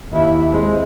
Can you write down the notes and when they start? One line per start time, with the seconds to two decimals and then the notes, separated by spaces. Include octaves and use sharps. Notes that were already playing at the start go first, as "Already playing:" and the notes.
0.11 D#2 E4
0.50 G#3 C4